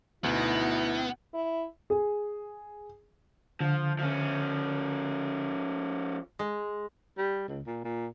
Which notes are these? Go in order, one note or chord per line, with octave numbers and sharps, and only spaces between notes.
D2 B2 B3 D#4 E4
E4
G#4
D3 F3
F3 C#4
G#3
G3
C#2
A#2
A#2